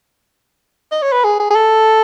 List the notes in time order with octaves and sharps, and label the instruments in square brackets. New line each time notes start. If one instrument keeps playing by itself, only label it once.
[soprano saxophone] D#5
C#5
B4
G#4
G#4
G#4
A4